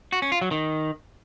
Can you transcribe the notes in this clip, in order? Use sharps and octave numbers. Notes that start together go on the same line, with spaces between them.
F#4
C#4
F4
F#3
D#3